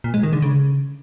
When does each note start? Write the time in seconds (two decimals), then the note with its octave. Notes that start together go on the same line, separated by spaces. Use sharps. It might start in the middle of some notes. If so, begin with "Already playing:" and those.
0.04 A#2
0.14 G#3
0.23 D#3
0.33 D3
0.42 C#3